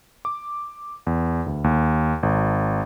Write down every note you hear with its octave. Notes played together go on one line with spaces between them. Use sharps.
D6
E2
D2
D#2
G#1